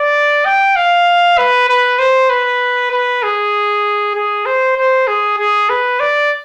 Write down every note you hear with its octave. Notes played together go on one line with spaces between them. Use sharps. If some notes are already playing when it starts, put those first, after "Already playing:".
Already playing: D5
G5
F5
B4
B4
C5
B4
B4
G#4
G#4
C5
C5
G#4
G#4
B4
D5